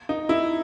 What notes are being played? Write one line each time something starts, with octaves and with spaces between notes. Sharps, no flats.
D#4
E4